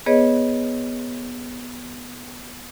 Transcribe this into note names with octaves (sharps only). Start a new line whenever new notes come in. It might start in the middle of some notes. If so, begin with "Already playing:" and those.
B3 G#4 B4 C#5 D#5